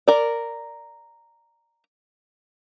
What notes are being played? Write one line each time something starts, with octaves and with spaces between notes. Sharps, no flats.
A#4 D5